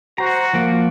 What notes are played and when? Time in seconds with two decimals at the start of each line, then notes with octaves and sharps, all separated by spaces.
0.18 F#4 C5 A#5
0.54 F3 A#3